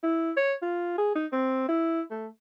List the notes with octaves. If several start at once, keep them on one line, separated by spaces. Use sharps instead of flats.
E4
C#5
F4
G#4
D#4
C4
E4
A3